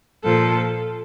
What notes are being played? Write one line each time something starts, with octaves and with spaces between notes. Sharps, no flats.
A#2 F3 A4